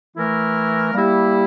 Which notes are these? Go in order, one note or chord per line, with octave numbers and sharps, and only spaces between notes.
E3 A3 E4 A#4
G3 A#3 E4 G4